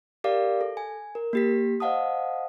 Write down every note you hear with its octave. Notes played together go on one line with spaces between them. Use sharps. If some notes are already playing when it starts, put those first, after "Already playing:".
G4 A#4 D5 F5 D6
A4
G#5
A#4
A#3 G4 B6
C5 D#5 F5 F#5 A5 D#6